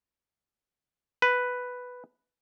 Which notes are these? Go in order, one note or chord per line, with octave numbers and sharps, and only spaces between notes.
B4